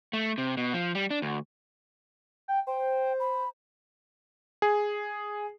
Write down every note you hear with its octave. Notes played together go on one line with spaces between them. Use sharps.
A3
C3
B2
F3
G3
D4
D2
G5
C5 G5
B5
G#4